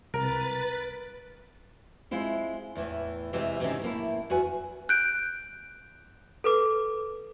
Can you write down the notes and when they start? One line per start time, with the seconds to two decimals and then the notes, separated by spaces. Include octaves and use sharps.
0.14 C2 A#4 B4 A6
2.11 G#3 C4 E4 F4
2.75 E2 A2 E3
3.33 E2 C3 E3 G3 G#3 C4
3.60 G#2 C3 D#3 E3 G#3 C#4
3.82 A2 A#3 E4
4.30 E2 F#4 B4 G#5
4.89 F#6 G6 D7
6.44 A4 B4 D6